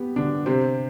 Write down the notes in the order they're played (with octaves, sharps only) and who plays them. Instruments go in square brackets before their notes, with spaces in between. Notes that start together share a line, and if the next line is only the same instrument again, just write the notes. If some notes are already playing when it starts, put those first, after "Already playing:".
Already playing: [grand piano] B3 G4
D3 D4
C3 C4